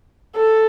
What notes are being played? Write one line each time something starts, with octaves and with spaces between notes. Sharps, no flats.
A4